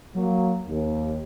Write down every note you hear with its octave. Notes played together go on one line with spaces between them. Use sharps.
F#3 A#3
D#2